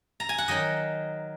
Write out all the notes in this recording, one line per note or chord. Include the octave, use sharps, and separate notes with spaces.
A#5
G#5
F#5
D#3 F#3 D#4 D#5